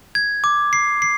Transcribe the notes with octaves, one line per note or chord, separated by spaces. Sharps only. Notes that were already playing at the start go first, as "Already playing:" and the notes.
G#6
D6
C7
C7